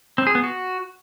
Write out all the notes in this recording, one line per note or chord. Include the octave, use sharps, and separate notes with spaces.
C4
G#4
B3
F#4